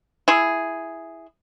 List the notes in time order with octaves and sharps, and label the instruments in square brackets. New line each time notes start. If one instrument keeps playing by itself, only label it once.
[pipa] E4 G#4